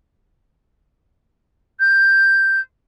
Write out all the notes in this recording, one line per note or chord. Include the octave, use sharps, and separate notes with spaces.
G6